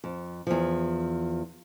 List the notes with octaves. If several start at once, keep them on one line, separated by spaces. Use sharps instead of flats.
F2
E2 F3